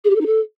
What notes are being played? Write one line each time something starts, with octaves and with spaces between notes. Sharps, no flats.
G#4
G4
A4
D#4
A4